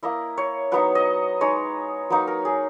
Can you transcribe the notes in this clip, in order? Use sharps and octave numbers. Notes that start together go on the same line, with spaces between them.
A#3 E4 D#5
C#5
F#3 B3 D#4 B4
D#5
G#3 D#4 C#5
F#3 A#3 D#4 B4
A#4
G#4